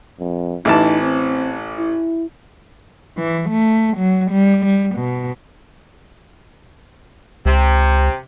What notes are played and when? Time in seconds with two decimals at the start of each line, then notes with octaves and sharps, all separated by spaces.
0.19 F2
0.65 A1 E3 D#4 A5
1.01 C4
1.79 E4
3.17 E3
3.50 A3
3.97 F#3
4.31 G3
4.66 G3
4.95 B2
7.46 C#2 C3